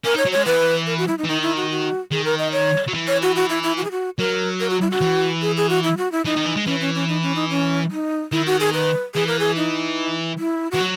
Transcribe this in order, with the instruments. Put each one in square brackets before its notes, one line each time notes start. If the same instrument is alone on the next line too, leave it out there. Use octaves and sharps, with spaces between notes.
[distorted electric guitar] C#4 [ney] A#4
[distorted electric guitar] D#4
[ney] C#5
[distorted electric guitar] F#3
[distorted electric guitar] G#3 [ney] C#5
[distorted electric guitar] E3 [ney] B4
[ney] A#4
F#4
E4
D#4
[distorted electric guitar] E3
[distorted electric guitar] D#3 [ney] D#4
[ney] E4
F#4
F#4
[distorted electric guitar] D#3 [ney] G#4
[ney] A#4
D#5
C#5
[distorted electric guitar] F#3
E3
[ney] C#5
F#4
F#4
E4
E4
F#4
G#4
F#4
[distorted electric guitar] F#3 [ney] A#4
[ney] A#4
F#4
E4
F#4
[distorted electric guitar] E3
[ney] G#4
G#4
F#4
E4
F#4
E4
[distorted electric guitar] E3 [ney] D#4
[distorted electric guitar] D#3
E3
G#3
[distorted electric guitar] E3 [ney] C#4
[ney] C#4
C#4
D#4
C#4
D#4
C#4
D#4
[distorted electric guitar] D#3 [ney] E4
[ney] F#4
G#4
B4
[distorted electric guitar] E3 [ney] G#4
[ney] A#4
G#4
D#4
E4
[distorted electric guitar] E3 [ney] F#4
[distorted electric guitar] F#3